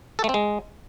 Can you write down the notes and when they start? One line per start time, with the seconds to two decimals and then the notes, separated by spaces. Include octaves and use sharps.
0.19 A4
0.24 A3
0.29 C4
0.34 G#3